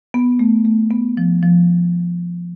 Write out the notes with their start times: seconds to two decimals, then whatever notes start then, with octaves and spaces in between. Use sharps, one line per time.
0.14 B3
0.39 A3
0.65 A3
0.91 B3
1.17 F3
1.43 F3